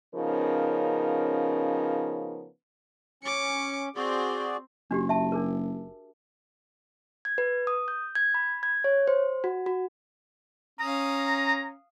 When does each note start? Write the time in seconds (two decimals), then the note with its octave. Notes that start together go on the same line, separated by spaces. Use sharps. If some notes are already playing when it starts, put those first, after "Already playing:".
0.15 C#3 F3 B3 C#4 D#4 A#4
3.23 C#4 D6 C#7
3.96 C4 F#4 G#4 C5 D5
4.91 F#1 D4 F#4 G4
5.09 E5 A5
5.32 D4 G#4 A#4
7.25 G#6
7.38 B4
7.67 D#6
7.88 G6
8.15 G#6
8.34 B5
8.63 G#6
8.84 C#5
9.08 C5
9.44 F#4
9.66 F#4
10.80 C#4 F5 A#5 D#6